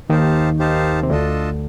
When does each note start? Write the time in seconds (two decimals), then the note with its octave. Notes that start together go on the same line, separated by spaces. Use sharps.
0.09 D#2 D#3 D#4 G4 C5 F5 A5
0.59 D#4 G4 C5 F5 A5
1.03 C3
1.10 D2 D3 D4 F4 A4 D#5 A5